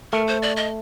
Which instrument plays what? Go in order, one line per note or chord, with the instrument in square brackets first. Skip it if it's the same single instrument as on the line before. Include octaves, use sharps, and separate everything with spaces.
[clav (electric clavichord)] A3 [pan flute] A#4
[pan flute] C5
D5
D#5